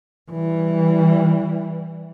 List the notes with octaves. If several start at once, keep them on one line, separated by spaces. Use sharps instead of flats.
E3 G3